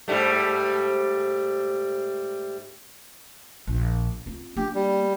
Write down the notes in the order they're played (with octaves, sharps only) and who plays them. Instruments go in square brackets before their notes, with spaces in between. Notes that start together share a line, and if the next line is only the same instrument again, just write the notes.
[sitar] G#2 G3 A3
[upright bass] A#1
C4 F4
[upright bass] A#3 D4 [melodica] G4
[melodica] G3